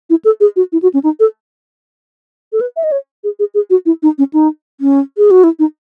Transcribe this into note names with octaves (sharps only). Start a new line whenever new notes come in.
E4
A4
G#4
F#4
E4
F#4
C#4
D#4
A4
A4
B4
E5
D#5
C#5
G#4
G#4
G#4
F#4
E4
D#4
C#4
D#4
C#4
G#4
F#4
E4
D#4